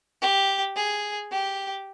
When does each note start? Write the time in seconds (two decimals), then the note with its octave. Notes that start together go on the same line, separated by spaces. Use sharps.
0.22 G4
0.76 G#4
1.31 G4